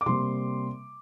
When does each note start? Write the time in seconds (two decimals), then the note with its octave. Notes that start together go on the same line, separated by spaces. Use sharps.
0.01 D6
0.06 C3 G3 A#3 C6